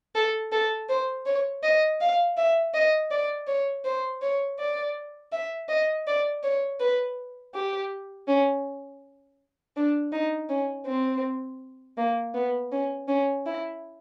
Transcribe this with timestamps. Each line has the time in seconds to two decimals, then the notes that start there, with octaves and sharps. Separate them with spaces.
0.15 A4
0.52 A4
0.89 C5
1.26 C#5
1.63 D#5
2.01 F5
2.37 E5
2.74 D#5
3.11 D5
3.47 C#5
3.85 C5
4.22 C#5
4.59 D5
5.32 E5
5.69 D#5
6.07 D5
6.43 C#5
6.80 B4
7.55 G4
8.28 C#4
9.77 D4
10.12 D#4
10.49 C#4
10.86 C4
11.97 A#3
12.35 B3
12.72 C#4
13.08 C#4
13.46 E4